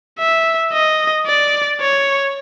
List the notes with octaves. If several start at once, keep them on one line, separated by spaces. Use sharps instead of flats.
E5
D#5
D5
C#5